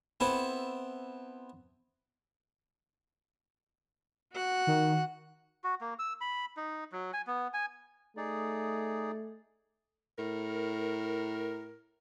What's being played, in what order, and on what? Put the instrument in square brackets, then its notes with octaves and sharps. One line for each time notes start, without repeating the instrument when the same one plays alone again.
[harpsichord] B3 C4 E4 A4
[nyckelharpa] F#4 F#5
[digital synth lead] D#3
[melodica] F#4
A#3
E6
B5
D#4
F#3
G#5
B3
G#5
[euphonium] A3 [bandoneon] D#4 G#4 D5
[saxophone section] A2 A#4